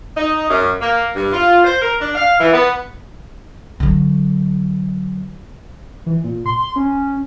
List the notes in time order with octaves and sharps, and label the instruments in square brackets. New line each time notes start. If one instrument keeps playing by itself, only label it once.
[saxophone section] D#4
F#2
A#3
G2
F4
C5
A#4
D4
F5
E3
B3
[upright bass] D3 F#3
[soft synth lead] E3
A#2
C6
C#4